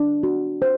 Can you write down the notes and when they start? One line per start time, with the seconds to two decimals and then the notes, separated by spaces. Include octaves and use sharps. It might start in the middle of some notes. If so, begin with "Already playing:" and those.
Already playing: D4
0.23 F#4
0.62 C5